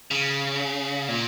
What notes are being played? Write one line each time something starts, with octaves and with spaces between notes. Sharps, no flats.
C#3
A#2